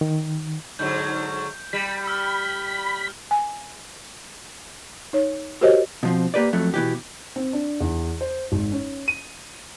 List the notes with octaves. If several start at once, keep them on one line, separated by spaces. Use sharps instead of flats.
D#3
G#2 D3 F#3 G6
G3 B5
E6 F6
G#5
D#4 C#5
F#4 G4 A#4 C5 C#5 D#5
B2 F3 C4
A#3 G4 B4 D5
F2 F#3 A3
B2 E3 G4
C4
D4
E2
C5
G#1
C#4
D#7